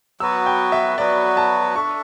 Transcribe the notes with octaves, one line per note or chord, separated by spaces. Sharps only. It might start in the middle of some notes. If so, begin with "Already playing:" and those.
F#3 B3 F#4 B4 E6
G5
E5
F#3 B3 F#4 B4 D5
A5
D4 A4 E5 C#6